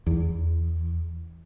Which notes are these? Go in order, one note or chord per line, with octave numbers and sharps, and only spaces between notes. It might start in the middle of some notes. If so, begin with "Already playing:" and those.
E2